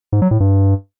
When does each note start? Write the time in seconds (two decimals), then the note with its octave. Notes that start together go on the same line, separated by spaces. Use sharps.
0.12 G#2
0.22 F#3
0.31 A2
0.40 G2